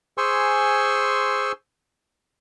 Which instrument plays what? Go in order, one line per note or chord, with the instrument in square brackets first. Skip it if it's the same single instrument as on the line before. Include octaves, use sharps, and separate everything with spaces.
[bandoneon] G#4 C5 G#5 C6 C#6 E6